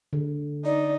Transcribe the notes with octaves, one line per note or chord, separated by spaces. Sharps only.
D3
D#4 D5